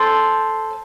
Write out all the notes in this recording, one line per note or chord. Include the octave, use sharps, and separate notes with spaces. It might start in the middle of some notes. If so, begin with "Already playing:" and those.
Already playing: A4 C5